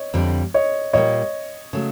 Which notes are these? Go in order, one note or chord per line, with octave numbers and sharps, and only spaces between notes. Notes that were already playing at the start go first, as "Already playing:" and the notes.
Already playing: C#5 D#5
F2 D3 G3
C#5 D#5
A#2 G3 A#3 C#5 D#5
C#3 F#3 A3